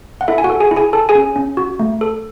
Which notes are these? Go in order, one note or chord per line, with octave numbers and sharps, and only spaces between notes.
F#5
E4 A4 E5
G#5
F#4 F#5
A4
G#4 G#5
E4
G#4 G#5
A4 A5
G#4 G#5
C#4
C#4
F#4
A3
A4